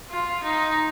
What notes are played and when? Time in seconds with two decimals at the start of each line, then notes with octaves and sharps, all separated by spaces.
0.11 F4
0.44 D#4